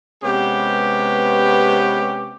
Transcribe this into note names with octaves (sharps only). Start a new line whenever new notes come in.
C3 G#3 B3 C#4 G4 B4